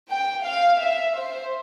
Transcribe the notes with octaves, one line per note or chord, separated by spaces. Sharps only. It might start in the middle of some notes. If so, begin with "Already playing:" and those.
G5
F5
E5
C5